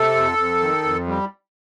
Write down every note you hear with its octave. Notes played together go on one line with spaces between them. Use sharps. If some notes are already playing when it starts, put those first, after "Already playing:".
Already playing: C3 A4
F2
F2
D#3
F2
G3